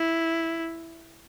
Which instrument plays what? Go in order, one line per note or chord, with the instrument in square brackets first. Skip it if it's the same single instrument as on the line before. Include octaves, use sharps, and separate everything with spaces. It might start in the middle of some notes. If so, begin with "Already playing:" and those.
Already playing: [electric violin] E4